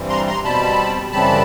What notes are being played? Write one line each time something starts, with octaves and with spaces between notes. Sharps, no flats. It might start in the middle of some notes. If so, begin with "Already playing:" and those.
Already playing: G2 E3 G3 C4
A#5 C6
A#5 C6
B2 G3 C4 A5 B5
F#2 C#3 E3 G3 C4 A5 B5